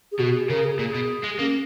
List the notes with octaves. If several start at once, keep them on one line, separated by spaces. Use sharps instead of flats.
G#4
B2 F#4
G#4
C#3 A#4
G#4
A#2 G#4
B2
G#3
A#3 C#4